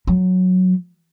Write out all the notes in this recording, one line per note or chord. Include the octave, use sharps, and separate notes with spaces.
F#3